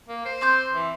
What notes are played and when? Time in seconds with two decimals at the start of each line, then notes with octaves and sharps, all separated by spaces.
0.08 A#3
0.25 C5
0.41 C4 D6 G6
0.72 E3